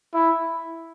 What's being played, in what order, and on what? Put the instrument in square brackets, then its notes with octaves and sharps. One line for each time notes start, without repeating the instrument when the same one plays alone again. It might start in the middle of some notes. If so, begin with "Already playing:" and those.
[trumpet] E4